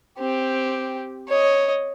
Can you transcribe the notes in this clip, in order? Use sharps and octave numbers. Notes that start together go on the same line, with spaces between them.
C4 G4
C#5 D#5